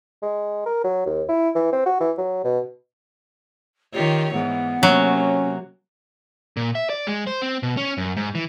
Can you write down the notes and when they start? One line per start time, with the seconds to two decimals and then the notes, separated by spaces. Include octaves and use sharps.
0.22 G#3
0.66 A#4
0.84 F#3
1.06 D#2
1.29 E4
1.55 E3
1.72 C4
1.86 F#4
2.00 E3
2.18 F#3
2.44 B2
3.94 D#3 F4 G4 C#5
4.32 G#2 E3 B3
4.83 C3 F#3 A#3 C#4
6.57 A#2
6.75 E5
6.90 D5
7.07 G#3
7.27 C5
7.42 C4
7.63 B2
7.77 C#4
7.98 F#2
8.17 G#2
8.35 E3